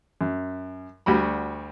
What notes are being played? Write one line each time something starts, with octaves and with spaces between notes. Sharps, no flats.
F#2
D2 G3 F#4 B5